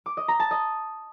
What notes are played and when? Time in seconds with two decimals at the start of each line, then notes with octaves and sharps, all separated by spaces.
0.06 D6
0.17 D#5
0.28 A#5
0.40 A5
0.51 D#5